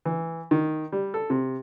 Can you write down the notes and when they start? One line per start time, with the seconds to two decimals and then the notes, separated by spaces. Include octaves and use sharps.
0.05 E3
0.51 D#3
0.92 G3
1.14 A4
1.30 C3